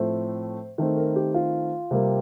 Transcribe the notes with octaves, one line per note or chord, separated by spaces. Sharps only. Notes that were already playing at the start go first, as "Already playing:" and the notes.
Already playing: A2 F3 A3 C4 C5
D#3 A3 C4
A#4
G4
F4
C3 G3 A#3